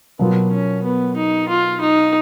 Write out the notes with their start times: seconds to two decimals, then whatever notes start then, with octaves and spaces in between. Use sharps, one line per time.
0.19 B2 F#3 A#3 B3 F4
0.52 C#4
0.84 B3
1.16 D#4
1.48 F4
1.81 D#4